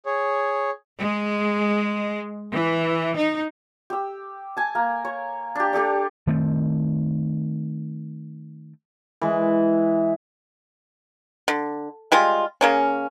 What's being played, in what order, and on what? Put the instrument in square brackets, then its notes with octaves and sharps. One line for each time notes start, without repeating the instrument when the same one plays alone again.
[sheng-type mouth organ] G#4 C#5
[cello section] G#3
E3
D#4
[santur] G4 E6
G#5 A5
A#3
C#5
D4 G4
D4 G4 A4 D5
[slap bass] D#3 A3 C4
[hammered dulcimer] E3 G#3
[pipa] D3
G3 G#3 F4
C#3 A#3 C#4